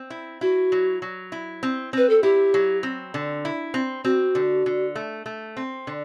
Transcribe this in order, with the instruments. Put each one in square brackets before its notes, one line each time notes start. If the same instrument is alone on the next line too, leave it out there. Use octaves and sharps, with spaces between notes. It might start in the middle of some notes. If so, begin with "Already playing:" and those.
Already playing: [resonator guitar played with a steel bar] C4
E4
[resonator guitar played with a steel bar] E4 [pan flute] F#4
[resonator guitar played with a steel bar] F#3
F#3
E4
C4
[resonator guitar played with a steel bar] C4 [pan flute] B4
[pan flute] A4
[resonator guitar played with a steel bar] E4 [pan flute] G4
[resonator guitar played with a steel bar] F#3
C4
D3
E4
C4
[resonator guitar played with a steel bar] C4 [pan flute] F#4
[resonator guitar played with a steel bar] D3
D3
A3
A3
C4
D3